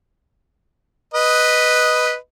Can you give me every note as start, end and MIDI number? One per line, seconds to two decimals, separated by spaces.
1.14 2.15 71
1.14 2.15 75